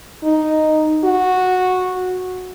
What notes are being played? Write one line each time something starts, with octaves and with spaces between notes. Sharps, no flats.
D#4
F#4